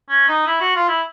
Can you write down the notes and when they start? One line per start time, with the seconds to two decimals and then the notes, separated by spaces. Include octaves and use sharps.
0.09 C#4
0.28 D#4
0.46 E4
0.60 F#4
0.75 F4
0.88 E4